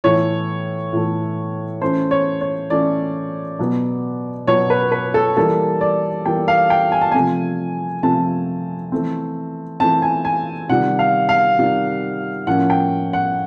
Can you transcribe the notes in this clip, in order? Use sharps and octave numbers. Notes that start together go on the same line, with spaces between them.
A2 E3 A3 C#5
A2 E3 A3
E3 A3 C#4 C5
C#5
C#5
E3 A3 C#4 D5
B2 F#3 B3
B2 F#3 B3 C#5
B4
B4
A4
E3 G3 A#3 A4
D5
E3 G3 A#3 G5
F5
G5
G#5
A5
C3 F3 A3 C4 G#5
C3 F3 A3 C4 A5
E3 A3 C4
E3 A3 C4 A5
G#5
G#5
C3 D#3 G3 F#5
F5
F5
C3 D#3 G3
A2 F3 A#3 C#4 F#5
G5
F#5